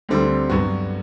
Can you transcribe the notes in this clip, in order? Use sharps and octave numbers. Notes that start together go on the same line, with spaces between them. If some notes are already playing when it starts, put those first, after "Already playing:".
D2 D3 G3 C4
G2 F#3 B3 F#4